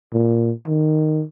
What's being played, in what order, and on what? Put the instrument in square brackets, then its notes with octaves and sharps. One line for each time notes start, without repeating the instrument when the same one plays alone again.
[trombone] A#2
D#3